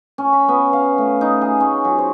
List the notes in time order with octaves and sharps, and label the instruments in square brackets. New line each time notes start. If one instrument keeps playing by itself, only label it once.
[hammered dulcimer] C#4
B5
B3
F5
A3
D#4
G#4
C#4
F#3
C5